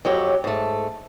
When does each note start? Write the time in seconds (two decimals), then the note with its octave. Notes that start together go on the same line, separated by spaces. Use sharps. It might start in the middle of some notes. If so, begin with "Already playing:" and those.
0.05 F2 F#3 G4 C#5
0.44 G#2 A3